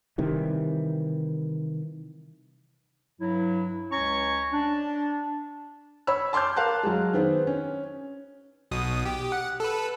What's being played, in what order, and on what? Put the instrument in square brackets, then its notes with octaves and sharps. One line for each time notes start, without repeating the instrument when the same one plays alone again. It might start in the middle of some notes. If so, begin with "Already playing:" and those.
[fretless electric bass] C3 D#3 E3 G3
[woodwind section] G2 F#3 E4
C#2 C#4 C#5 A#5 C#6
D4
[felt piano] C#5 B5 E6
A5 C6 D6 F6 G6
A#4 F5 A5 F#6
F#3 G#3
D#3 B3 C4
C#4
[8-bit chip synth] B1 B2 D#6
G4
F#5
A4 B4